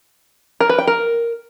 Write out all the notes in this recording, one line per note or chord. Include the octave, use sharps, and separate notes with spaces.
A#4
B4
G5
A#4